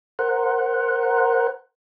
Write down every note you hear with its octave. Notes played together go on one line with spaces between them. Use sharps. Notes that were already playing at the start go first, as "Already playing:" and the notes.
A#4 C5 F#5